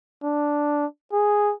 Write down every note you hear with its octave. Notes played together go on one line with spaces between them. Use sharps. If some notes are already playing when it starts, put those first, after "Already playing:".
D4
G#4